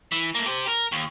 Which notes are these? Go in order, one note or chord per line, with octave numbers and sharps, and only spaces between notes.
E3
A3 A#3
G4 C5
A#4
D#2